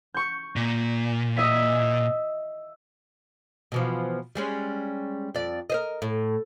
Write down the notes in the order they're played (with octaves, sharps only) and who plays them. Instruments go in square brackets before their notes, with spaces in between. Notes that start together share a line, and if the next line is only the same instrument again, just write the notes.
[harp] C#6 G6
[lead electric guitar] A#2
[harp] D#5 E5 B6
[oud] B2 E3 F3
G3 G#3 C#4
F2 D5
A#4 C5 D#5
A2